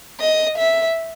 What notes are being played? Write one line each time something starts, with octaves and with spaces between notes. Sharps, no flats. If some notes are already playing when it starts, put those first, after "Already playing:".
D#5
E5